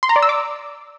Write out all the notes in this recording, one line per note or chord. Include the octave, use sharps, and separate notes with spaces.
C6
A#5
D5
E6
D6